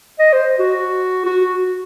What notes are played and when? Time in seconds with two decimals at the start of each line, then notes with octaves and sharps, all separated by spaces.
0.19 D#5
0.33 C5
0.59 F#4
1.26 F#4